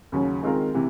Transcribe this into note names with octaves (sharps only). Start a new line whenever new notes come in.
D#2 C#3 F#3
D#3 G#3 C4 F4 A#4
C3 E3